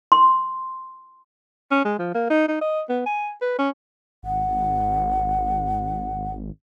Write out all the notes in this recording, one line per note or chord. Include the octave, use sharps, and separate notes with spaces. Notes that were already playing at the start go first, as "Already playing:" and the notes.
C6
C#4
G#3
F3
A#3
D#4
D#4
D#5
B3
G#5
B4
C#4
G#1 F#5